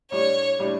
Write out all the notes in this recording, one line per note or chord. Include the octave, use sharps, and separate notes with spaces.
A2 G3 D4 C#5
A2 G3 D4